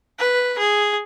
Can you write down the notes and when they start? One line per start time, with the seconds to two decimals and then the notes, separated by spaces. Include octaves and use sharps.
0.19 B4
0.59 G#4